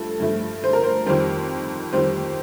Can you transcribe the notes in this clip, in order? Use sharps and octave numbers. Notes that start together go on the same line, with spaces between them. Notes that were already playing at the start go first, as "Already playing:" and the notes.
Already playing: G2 F3 A3 A4
G2 F3 A3
C5
A#4
C5
F2 D#3 G3 C5
F2 D#3 G3 C5